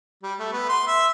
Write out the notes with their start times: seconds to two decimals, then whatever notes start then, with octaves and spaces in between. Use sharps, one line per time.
0.23 G3
0.39 A3
0.52 B3
0.69 C6
0.87 E5